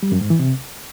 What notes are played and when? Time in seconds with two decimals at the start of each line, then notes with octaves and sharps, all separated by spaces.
0.03 G3
0.12 F#2
0.21 G#2
0.30 E3
0.39 C3